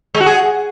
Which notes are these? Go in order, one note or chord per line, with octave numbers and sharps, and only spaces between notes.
G#3
F#4
G#4